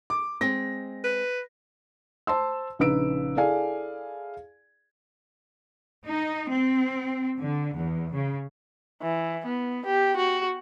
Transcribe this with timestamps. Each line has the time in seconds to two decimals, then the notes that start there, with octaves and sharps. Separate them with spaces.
0.10 D6
0.41 G#3 C4 A#6
1.04 B4
2.27 C5 A5 C6 E6
2.79 A#1 C#3 D#4 B4 E6 D7
3.36 E4 G#4 A4 D5 F5 G#5
6.06 D#4
6.52 C4
7.39 D3
7.78 E2
8.15 C#3
9.02 E3
9.46 B3
9.86 G4
10.17 F#4